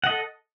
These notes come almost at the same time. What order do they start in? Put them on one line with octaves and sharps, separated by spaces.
F#5 D#5 A4